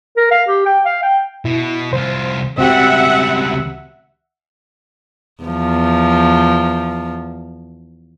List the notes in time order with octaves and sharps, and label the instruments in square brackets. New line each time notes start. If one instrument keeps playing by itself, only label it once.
[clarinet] A#4
F5
G4
G5
F5
G5
[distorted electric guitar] B2 [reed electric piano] E4
[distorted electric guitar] C2 F4 [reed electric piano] C5
[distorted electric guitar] C#2 G3 [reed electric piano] C4 F#4 G4 [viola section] E5 F#5
[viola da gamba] E2 F3